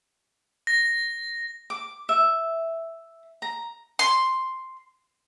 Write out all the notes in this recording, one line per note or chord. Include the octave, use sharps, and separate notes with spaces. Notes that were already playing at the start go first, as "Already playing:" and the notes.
A#6
D6
E5
A#5
C6